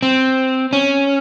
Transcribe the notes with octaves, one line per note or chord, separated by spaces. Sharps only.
C4
C#4